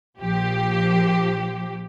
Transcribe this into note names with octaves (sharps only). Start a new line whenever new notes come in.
A#1 F3 G4